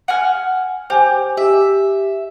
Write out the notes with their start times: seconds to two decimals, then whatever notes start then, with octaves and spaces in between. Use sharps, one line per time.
0.08 F#5 G#5 F6
0.90 G4 C5 G#5
1.37 G4 E5